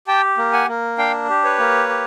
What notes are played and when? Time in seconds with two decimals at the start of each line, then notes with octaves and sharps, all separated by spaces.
0.07 G4 G5 A5
0.38 A#3
0.53 F#5 G#5
0.68 A#3
0.98 D4 F5 G5
1.29 G4
1.44 B4 C#5
1.59 A#3
1.89 G4